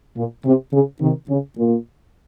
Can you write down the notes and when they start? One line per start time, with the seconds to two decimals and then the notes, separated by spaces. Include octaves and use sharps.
0.16 A#2
0.45 C3
0.73 C#3
1.01 C3 D#3
1.29 C#3
1.57 A#2